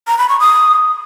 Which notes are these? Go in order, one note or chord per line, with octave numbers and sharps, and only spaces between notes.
A#5
B5
C#6
D#6